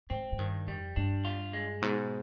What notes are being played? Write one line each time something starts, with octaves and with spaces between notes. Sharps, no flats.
G#2 C4
G#2
G2 D#3
F2 G3
G2 D4
F4
G#3
G#2 B2